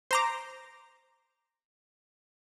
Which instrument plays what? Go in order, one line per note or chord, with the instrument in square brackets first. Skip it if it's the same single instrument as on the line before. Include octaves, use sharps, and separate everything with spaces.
[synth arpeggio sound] C5 A#5 D6